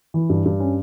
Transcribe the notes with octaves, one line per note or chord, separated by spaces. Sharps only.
E3
G2
G2
C#4